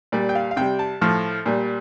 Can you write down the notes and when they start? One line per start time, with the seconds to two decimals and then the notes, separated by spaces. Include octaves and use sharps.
0.12 A#2 G3 D5
0.29 G5
0.35 F5
0.51 F5
0.57 C3 G3 G5
0.79 A5
1.01 A2 F3
1.46 A#2 G3